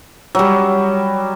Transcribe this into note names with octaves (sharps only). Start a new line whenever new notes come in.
F#3 G3